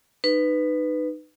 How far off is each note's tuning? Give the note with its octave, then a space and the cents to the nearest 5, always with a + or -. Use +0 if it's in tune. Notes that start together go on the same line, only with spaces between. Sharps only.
D#4 -25 B4 +10